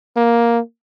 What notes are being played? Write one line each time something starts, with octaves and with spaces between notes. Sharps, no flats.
A#3